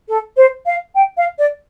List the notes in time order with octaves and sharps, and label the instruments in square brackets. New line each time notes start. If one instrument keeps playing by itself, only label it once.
[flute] A4
C5
F5
G5
F5
D5